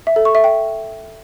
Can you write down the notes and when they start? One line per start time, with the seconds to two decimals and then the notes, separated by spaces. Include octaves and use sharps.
0.07 E5
0.16 A4
0.25 C#6
0.35 E5
0.44 G5